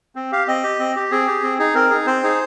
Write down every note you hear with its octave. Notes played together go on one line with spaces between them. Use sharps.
C4
G4 F5
C4 D#5
G4
C4
G4
C4 G#4
G4
C4
D#4 G#4
C4 A#4
D#4 G#4
C4 C5
D#4 G#4